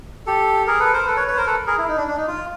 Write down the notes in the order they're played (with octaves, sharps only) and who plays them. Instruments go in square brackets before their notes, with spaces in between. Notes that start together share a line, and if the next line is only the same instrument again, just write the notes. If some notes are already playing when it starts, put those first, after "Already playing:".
[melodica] G4 A4
G#4 A#4
A4 B4
A#4 C5
A4 B4
B4 C#5
B4 C#5
A#4 C5
A4 B4
G#4 A#4
E4
D#4
D4
D4
D#4
F4